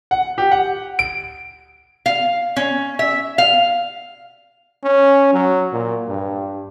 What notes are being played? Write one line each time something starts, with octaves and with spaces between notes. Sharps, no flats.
F#5
G4
F#5
D7
F5
C#4
E5
F5
C#4
F#3
A#2
G2